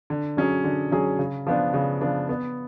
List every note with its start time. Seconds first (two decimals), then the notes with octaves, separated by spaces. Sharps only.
0.10 D3
0.37 F#3 C#4 G#4
0.64 D3
0.92 F#3 C#4 G#4
1.19 C#3
1.47 F3 B3 D4
1.74 C#3
2.01 F3 B3 D4
2.29 B3